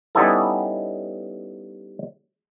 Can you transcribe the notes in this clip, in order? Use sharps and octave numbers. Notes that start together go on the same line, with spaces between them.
G3 B3 C#4 D#4 E4 A4